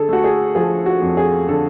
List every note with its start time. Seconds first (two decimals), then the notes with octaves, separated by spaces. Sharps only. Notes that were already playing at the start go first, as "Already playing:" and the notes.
Already playing: D3 G#4 A4
0.09 A3 F#4
0.24 G#4
0.55 F3 G#4
0.86 F#4
1.02 F2
1.17 G#4
1.48 D3 A4